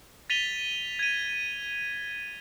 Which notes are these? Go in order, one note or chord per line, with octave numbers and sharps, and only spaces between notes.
A6 B6 D#7 F7 G7
G#6 D#7